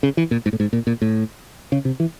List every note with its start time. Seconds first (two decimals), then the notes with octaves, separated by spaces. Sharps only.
0.03 C#3
0.17 E3
0.31 A#2
0.46 G#2
0.53 A2
0.60 G#2
0.73 A#2
0.87 A#2
1.02 A2
1.72 C#3
1.85 C3
2.00 E3